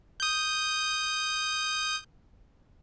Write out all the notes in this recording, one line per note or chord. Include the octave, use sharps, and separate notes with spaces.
D#6 G6